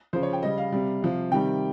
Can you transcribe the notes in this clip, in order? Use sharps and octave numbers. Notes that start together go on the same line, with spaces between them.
C#3 F3 C5
C#5
G5
C#3 G3 D#5
F5
C3 G3
C3 F3
C3 D#3 G3 G5